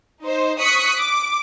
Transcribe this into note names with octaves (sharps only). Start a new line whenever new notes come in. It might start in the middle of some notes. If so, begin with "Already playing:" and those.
D#4 C5
C#6 D#6 F#6 B6 C#7
D6